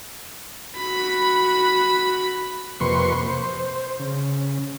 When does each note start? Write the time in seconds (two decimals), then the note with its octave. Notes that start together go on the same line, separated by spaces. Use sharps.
0.77 F#4 B5
2.80 F2 C3 A#3 B4 C6 C#6
3.26 C5
4.00 C#3